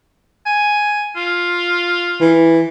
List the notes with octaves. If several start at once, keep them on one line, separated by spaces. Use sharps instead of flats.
G#5
F4
E3